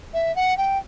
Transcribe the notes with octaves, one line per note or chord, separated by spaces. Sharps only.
E5
F#5
G5